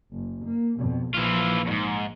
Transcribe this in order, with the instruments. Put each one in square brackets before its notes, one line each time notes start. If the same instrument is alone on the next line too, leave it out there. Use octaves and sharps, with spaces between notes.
[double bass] F#1
A#3
F2 B2
[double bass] A#1 F3 [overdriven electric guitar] E3 F4
[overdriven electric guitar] E2 G#2